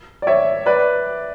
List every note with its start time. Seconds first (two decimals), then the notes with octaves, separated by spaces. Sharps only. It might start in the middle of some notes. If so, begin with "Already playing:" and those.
0.22 D5
0.27 C#5 E5
0.66 B4 D5